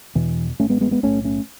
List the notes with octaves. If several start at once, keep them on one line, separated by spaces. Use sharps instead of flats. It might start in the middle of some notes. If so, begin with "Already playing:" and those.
E1 E2 B2 E3
A1 A2 A3 C#4
G#3 B3
G#3 B3
G#3 B3
B1 A2 A3 C#4
A3 C#4